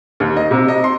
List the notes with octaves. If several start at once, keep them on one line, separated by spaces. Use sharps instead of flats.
D#2
D#5
C3
D#5
C6